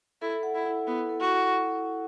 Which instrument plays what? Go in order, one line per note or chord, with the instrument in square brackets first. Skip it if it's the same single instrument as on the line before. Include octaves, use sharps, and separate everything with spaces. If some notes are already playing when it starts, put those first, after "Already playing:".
[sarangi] E4 [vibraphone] A4
[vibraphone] F#5
[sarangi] E4
[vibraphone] E4
[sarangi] B3 [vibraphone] E4
[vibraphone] A4
[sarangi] F#4
[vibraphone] F#5
E4
E4